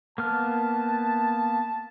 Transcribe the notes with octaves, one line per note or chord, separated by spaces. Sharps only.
A#3 B3 A5 F6